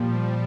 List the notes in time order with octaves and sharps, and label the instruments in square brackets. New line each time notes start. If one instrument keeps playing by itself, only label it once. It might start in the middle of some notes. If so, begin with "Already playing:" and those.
Already playing: [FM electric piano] A#2 [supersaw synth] F3 G3